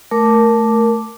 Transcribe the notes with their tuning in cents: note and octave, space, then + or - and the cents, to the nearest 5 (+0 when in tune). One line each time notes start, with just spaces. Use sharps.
A3 +0 A#4 +0 D6 +0